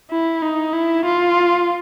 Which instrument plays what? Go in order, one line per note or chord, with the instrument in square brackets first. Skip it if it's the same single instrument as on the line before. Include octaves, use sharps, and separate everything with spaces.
[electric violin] E4
D#4
E4
F4